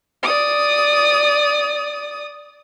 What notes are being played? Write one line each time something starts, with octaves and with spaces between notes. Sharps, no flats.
D5 D#6